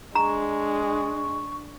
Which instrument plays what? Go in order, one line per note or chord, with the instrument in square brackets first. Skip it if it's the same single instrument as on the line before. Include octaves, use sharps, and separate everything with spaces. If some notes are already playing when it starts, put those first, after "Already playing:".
[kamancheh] G#3 [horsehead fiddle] D4 [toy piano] A#5 [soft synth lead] C#6